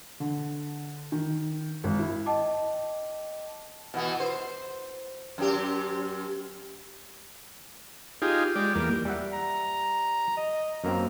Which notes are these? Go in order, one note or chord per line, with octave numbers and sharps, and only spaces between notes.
D3
D#3
G#1
E4
D#5 G5 A5 D6
B2 E3 B3
C5
F#2 C4 G4
D#4 F4 G4 G#4
G#3 G4 D5
E2 G3 A#3
G3 E5 F#5
A#5
D#5
F#2 A#3 C4 A#5